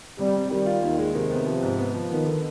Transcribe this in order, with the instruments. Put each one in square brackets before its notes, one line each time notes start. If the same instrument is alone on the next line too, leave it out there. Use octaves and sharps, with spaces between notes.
[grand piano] C3 [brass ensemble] G3
[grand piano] C3
[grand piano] D#3 [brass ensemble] G3
[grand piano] F4
[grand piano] D#2 [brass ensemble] D#3
[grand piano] G#3
[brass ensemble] C3 [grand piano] D#3
[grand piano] B3
F3
G#2
B3
F3
[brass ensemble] D#3 [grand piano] B3
[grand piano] D3